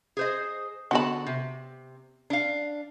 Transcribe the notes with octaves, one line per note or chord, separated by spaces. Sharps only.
G#4 C5 D#5
D3 B3 F#4 A5 B5
C3
D4 F5